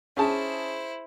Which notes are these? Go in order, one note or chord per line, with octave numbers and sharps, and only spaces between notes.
C#4 E4 G#4 C5 A5